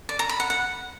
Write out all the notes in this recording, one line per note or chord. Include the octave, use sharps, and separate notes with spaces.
D5
A#5
B5
F#5
F#5